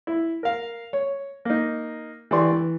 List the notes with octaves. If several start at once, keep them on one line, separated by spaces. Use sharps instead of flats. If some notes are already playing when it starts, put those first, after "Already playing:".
E4
A#4 F5
C#5
A#3 D#4
E3 G4 D5 C6 C#6
E3